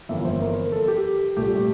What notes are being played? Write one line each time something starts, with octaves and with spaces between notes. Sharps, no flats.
G1 F2 E3 A#3 E5
C5
A#4
A4
G4
C2 A#2 A3 G4